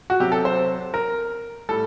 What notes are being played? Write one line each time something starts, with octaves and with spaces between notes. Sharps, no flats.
F#4
C3 F#3 G4
A4
C5
A#4
A2 G3 A4